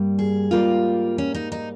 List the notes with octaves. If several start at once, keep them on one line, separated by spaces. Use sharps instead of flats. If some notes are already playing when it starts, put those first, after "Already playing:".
Already playing: G2 G3 A#3
G#4
G#2 G3 A#3 F4
C#4
D#4
D#4